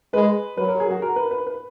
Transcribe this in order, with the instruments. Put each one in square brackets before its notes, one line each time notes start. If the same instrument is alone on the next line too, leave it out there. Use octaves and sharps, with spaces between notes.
[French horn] G#3 [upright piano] B4
[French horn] F#3 [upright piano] B4
[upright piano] A#4
G#4
F#4
A#4
B4
B4
B4